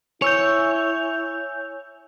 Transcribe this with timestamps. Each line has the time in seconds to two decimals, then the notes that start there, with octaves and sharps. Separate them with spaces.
0.22 E4 C#5 G#5 E6 G6